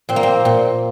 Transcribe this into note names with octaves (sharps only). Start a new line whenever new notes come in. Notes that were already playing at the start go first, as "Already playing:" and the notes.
A#2 C4
A#3
C4
A#2